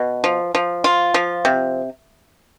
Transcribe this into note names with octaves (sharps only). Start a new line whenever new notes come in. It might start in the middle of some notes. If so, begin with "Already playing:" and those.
Already playing: B2
F3
F3
F4
F3
C3